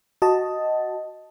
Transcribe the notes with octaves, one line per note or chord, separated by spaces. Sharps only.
F#4 D#5 A5